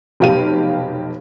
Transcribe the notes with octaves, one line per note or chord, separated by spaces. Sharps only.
F1 B1 G4 F5 D#7